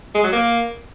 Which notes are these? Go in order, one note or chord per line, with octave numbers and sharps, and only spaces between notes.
G#3
F#3
A#3